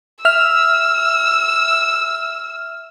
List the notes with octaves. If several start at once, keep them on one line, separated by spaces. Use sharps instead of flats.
E5 E6 F6